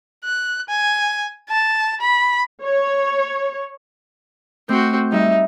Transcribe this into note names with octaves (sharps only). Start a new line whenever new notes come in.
F#6
G#5
A5
B5
C#5
A3 C4 F#4 G6
G3 D#4 E5